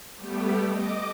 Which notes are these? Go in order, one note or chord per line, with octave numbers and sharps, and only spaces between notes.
G3 A3 B3 G4
D#5 D6